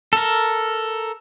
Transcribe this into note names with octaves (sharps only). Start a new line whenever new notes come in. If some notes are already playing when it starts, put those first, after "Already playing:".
A4 A#4